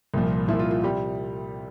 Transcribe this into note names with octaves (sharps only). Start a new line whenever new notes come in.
C2 A#2 F3
C2 A#2 F3 E4
F4
F4
C3 G3 G4